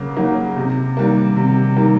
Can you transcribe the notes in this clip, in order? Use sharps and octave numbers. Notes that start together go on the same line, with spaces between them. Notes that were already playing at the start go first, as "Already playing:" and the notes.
Already playing: C#3 F#3 A#3
F#3 A#3 D#4
C3
D#3 G3 A#3
C3
D#3 G3 A#3